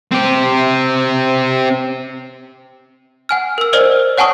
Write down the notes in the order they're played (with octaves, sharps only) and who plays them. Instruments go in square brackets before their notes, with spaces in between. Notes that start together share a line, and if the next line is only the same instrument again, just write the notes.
[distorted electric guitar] C4 G4
[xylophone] F#5 G#5 F6
A#4 E6
A#4 C5 D5 D#5 E6 F6
C#5 F#5 G#5 A5 C#6 D#6